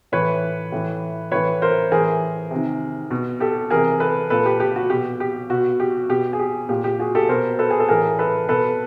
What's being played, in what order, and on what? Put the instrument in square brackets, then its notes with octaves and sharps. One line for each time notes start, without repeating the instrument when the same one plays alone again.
[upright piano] A2 E3 B4 C#5
A2 E3
A2 E3 B4 C#5
A#4 C5
A2 E3 G#4 A#4
C3
D#3
B2
G4 A4
C3 E3 G#4 A#4
A4 B4
A#2 A4 B4
G4
G4
F#4
B2 G4
G4
B2 F#4
G4
B2 G4
G#4
G4
A#2 G4
G4
F#4 G#4
G4 A4
B2 A#4 C5
A4 B4
G#4
A4
A2 E3 G#4 A#4
A4 B4
B2 A4 B4